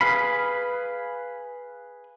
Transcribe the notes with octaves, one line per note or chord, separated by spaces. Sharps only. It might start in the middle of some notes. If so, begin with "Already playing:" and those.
G#4 A4 B4 F5 B5